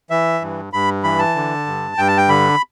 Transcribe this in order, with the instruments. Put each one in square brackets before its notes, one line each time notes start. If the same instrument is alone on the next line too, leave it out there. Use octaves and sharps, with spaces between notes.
[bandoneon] E3 E5
G2
G2 B5
E3 B5
A5
D3
G2
G2 G5
A5
G5
D3 B5